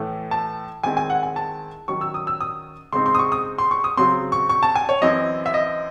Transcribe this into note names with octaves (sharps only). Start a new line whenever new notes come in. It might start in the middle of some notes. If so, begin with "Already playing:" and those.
Already playing: A2 E3 A3
A5
D#3 G#3 C4 E4 G#5
G#5
F#5
G#5
A5
D#3 F#3 C#4 C#6
E6
D#6
E6
D#6
C#3 G#3 C4 D#4 C6
C6
D#6
C#6
D#6
C6
C#6
D#6
C#3 F#3 C4 C6
C#6
C#6
A5
G#5
C#5
F#2 E3 C4 E4 D#5
E5
D#5